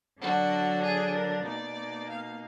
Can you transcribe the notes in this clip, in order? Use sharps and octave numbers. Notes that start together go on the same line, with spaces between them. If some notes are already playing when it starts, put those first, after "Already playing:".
D3 F#3 D4 F#4
G#4
A#4
B2 A#3 D#4 D5
F5